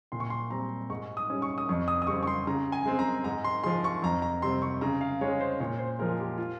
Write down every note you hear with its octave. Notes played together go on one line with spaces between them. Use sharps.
A#2 C6
C#6
C6
G3 C4 A#5
G#2 C#6
D#6
G3 C#4
C#6
D#6
F2 C#6
D#6
D#6
C#3 G3 C4 C#6
C#6
C6
C#3 A#5
G#5
G#3 C4
A#5
G#2 A#5
C6
F3 G#3 C6
C#6
F2 A#5
A#5
C3 G3 C4 C6
C#6
C#3 A#5
F5
G#3 C#4 C#5
C5
A#2 C#5
C5
F3 G#3 A#4
G4
F4